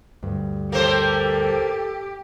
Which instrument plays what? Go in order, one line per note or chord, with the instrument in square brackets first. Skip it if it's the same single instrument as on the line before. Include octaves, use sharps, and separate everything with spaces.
[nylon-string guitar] D2 G2
[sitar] A#3 C5 [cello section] G4 [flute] A4